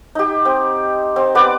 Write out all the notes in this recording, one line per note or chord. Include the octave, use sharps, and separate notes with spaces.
D#4 G4
C4
C4
B3 B4 D5 D6